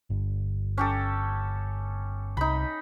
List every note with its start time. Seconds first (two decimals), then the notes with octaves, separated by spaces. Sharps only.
0.10 G1
0.77 C#4 G4 A4
2.37 C2 D#4 B5